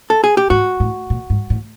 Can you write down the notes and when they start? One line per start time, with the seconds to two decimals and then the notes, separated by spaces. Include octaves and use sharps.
0.10 A4
0.24 G#4
0.37 G4
0.50 G#2 F#4
0.80 A2
1.10 A#2
1.30 G#2
1.50 A2